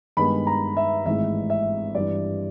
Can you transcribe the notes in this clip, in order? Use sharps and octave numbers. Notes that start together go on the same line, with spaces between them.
G2 D#3 G#3 B3 B5
A#5
E5
G#1 G#2 E3 A3 E5
E5
G2 E3 G3 D5